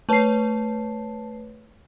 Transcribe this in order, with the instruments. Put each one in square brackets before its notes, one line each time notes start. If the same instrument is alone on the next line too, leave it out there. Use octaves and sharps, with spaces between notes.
[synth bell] A3 B4 C#5 [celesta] A5 C7